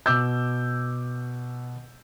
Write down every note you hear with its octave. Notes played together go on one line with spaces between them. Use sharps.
B2 D6 E6 G6